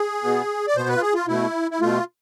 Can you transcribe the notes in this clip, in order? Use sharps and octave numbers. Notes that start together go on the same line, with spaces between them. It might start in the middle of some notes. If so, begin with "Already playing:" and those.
Already playing: G#4
B2 B3
D5
B2 B3 C5
B4
F4
G#4
F4
B2 A3 E4
E4
B2 A3 F4